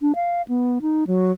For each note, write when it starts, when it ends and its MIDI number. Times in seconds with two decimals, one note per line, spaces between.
0.02 0.12 62
0.15 0.42 77
0.48 0.79 59
0.82 1.07 63
1.07 1.32 54